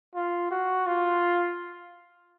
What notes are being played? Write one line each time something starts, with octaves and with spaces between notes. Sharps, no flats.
F4
F#4
F4